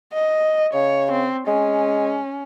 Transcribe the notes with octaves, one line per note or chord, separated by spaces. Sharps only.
D#5
C#3 C#5
C4
G#3 C#4